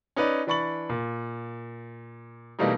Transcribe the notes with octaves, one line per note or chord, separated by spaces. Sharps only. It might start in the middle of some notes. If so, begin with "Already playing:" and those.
C#4 D#4 B4 D5
E3 D4 B5 C#6 A6 F#7
A#2
B2 E3 G3 A3 A#3 D#4